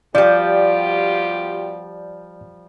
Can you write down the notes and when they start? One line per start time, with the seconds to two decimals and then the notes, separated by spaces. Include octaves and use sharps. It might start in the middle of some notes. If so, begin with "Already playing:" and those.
0.15 B2 F3 G3 F4 G4 D5